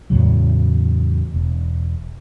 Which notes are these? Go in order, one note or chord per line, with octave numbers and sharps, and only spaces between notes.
E2 A2 C#3 F#3
E1